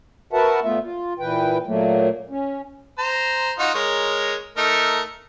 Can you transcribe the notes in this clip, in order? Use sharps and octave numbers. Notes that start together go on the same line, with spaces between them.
F#4 A#4 B4 E5 F#5 A5
A#2 A3 B3 F4 E5
F4
A#2 E3 B4 G5
A#2 F#3 A3 A#3
C#4
C5 A#5
D#4 F4 F#4
G#3 A#4 C#5
A3 D#4 A#4